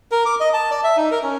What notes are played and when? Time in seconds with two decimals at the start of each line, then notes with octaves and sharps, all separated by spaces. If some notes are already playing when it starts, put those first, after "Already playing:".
0.12 A#4
0.26 D6
0.40 D#5
0.53 A5
0.71 D5
0.84 E5
0.97 D#4
1.11 A#4
1.23 C#4